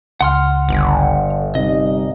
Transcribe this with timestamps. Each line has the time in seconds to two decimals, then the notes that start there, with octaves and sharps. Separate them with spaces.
0.21 C#2 F#5 C6 F6
0.69 G1 D3
1.55 C3 G3 D#4 D#5